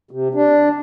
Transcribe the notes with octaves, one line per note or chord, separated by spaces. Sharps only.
C3
D4